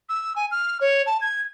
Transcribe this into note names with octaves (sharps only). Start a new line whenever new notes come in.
E6
G#5
F6
C#5
A5
G#6